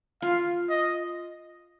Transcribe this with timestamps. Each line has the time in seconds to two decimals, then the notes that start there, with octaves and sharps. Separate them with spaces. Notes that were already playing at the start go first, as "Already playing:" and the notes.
0.22 F4 F5
0.69 D#5